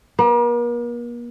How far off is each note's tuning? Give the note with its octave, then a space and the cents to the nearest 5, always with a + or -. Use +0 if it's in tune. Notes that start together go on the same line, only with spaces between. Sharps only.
A#3 +45